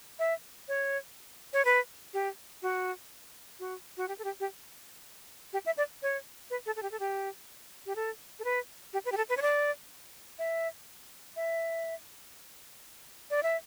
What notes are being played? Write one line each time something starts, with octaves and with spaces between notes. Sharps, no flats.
E5
C#5
C#5
B4
G4
F#4
F#4
F#4
G4
A4
G4
G4
G4
E5
D5
C#5
B4
A4
A4
G4
A4
G4
G4
A4
A4
B4
G4
B4
G4
A4
B4
C#5
D5
E5
E5
D5
E5